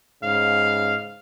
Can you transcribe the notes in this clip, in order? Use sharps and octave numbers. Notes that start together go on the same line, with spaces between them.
G#2 C#3 F5